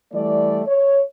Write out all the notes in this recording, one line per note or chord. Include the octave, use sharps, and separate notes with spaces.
E3 G3 A3 D5
C#5